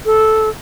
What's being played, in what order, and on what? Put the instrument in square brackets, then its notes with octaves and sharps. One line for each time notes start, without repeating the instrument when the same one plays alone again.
[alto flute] A4